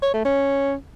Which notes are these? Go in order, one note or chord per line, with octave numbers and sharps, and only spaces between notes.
C#5
A3
C#4